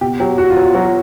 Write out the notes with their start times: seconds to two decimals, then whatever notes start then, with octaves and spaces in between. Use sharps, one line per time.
0.01 B2 G4
0.20 F#3 G4
0.38 E2 F#4
0.50 F4
0.57 F#3
0.62 F4
0.74 F#3 F#4